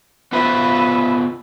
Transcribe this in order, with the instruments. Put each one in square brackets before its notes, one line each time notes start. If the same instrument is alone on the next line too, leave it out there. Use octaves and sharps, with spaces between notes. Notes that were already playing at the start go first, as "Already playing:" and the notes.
[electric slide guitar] B3 F4 C5 [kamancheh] B4 E5